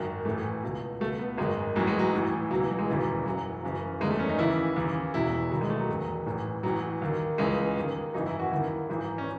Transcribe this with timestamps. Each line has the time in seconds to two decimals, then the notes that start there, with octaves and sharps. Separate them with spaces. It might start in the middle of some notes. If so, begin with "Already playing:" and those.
Already playing: G#1 F#2 D#3
0.25 A1 A2 E3 A3
0.63 C#2 B2
1.00 C#2 B2 A3
1.19 B3
1.37 G#1 F#2 D#3 G#3
1.76 A1 A2 E3 F#3
1.87 G#3
1.99 F#3
2.13 A1 A2 E3
2.50 C#2 F#3
2.54 B2
2.60 E3
2.69 F#3
2.79 G#3
2.88 E1 D#2 C#3 E3
3.26 F#1 F#2 E3 F#3
3.63 F#1 F#2 C#3 E3
4.00 F#1 E2 D#3 G#3
4.11 A3
4.19 C#4
4.29 D#4
4.38 D#2 C#3 E3 E4
4.76 D#2 C#3 E3
5.14 E1 E2 B2 E4
5.51 E1 D#2 D#3 F#3
5.61 G#3
5.70 A3
5.79 F#3
5.89 E1 E2 D#3
6.26 A1 A2 E3
6.63 A1 A2 E3 F#3
7.02 D#2 D#3
7.38 C#2 C#3 E3 G#3
7.77 D#2 D#3
8.14 G#1 F#2 C#3 E3 D#4
8.26 E4
8.39 F#4
8.51 D#2 E4
8.56 D#3
8.89 G#1 G#2 E3
9.18 C#4